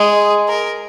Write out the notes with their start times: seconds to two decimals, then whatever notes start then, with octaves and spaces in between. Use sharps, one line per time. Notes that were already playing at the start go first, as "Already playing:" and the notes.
Already playing: G#3 G#4
0.48 A#4